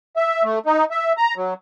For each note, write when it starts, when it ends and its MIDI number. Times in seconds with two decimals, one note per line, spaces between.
0.16 0.43 76
0.44 0.59 57
0.66 0.85 63
0.91 1.13 76
1.17 1.34 82
1.37 1.54 54